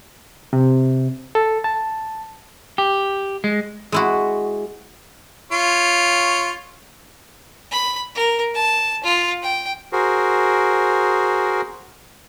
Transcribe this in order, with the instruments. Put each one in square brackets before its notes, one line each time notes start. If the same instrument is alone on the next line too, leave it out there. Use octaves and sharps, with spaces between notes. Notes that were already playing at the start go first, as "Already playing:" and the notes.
[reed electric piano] C3
A4
A5
[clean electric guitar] G4
G#3
[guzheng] G#3 E4 F#4
[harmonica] F4 C#5
[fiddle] B5
A#4
A5
F4
G5
[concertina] F#4 G#4 A#4 C5